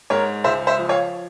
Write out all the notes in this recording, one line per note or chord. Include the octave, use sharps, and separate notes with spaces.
G#2 A#4 C#5
C#2 C5 E5
C5 E5
F3
C#5 F5